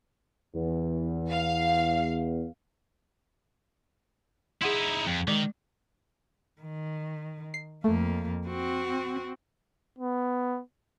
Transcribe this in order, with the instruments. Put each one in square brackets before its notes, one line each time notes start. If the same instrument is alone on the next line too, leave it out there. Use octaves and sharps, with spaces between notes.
[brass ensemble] E2
[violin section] F5
[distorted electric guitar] D#4 E4 [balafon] G#4 F#5 C6
[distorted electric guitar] F2
[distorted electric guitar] D#3 [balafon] G#3
[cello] D#3
[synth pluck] C7
[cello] F2 A#3 [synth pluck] A3
[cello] C4 F#4
[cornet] B3